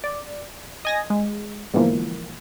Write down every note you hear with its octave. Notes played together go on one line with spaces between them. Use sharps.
D5
D#5 G#5 A#6
G#3
G#2 B2 D3 E3 F3 A#3